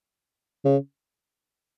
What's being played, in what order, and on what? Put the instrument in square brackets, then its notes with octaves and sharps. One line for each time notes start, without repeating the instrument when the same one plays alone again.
[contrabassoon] C#3